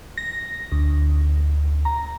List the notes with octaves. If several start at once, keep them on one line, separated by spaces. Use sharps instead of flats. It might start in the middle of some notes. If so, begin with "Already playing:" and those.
A#6
D2
A#5